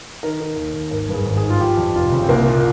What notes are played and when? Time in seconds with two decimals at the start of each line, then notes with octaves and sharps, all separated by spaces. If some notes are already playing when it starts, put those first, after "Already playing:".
0.23 D#3 A#4
0.40 D#3
0.56 D#2
0.74 D#2
0.91 G#1 A#4
1.09 G2
1.14 G#4
1.25 G#1
1.37 G#4
1.43 D#3
1.50 F4
1.60 F3 G4
1.77 F2
1.95 F1 F4
2.12 C#3
2.23 C4
2.29 C2 A#3
2.47 A#2